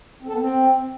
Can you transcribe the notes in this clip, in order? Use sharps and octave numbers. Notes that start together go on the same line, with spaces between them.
C4
A4
B3
C4